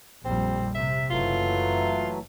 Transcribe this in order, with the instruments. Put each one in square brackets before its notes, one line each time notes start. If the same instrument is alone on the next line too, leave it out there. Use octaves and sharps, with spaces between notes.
[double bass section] A#1 F2 G3 [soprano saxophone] C4
[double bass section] C3 [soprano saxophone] E5
[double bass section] F#1 [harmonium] E3 F#3 A3 [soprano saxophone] F4